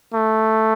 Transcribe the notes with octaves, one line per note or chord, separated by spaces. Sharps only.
A3